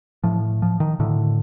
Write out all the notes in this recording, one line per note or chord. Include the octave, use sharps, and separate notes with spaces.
A2 F3
F3
D#3
A2 D3